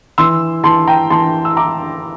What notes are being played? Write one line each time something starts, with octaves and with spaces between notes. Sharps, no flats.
E3 C6 E6
E3 A5 C6
G5 A#5
E3 A5 C6
E6
E4 A#5 D6